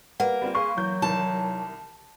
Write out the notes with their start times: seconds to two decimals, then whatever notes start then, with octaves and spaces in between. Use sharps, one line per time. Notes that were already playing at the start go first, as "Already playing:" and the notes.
0.20 G3 A#3 B4 F#5
0.42 G3 C4 F4
0.55 G#4 B4 F5 C6 C#6
0.77 E3 F#3 G6
1.02 C2 D#3 E3 A5